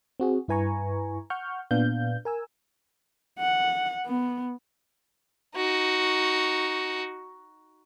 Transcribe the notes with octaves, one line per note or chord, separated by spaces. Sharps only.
C4 F#4 G#4
G2 E4 B4 G#5 A#5 C#6
F#5 C#6 F6 G6
A#2 B3 D4 F5 G6
A#4 G#5 E6
F#5
B3
D#4 F#4